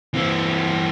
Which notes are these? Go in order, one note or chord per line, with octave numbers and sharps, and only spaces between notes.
E3 C4